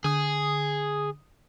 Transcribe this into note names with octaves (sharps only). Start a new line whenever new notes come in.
D3 G#4 D#6